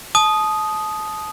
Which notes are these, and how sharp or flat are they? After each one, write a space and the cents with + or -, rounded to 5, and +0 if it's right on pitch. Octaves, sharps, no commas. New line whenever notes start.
A5 -30 D#6 +0